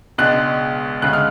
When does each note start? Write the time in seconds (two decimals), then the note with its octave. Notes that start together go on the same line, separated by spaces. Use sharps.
0.18 C#2 B2 G#3 D4 F#6
1.02 D2 C#3 G#3 F#6
1.13 F6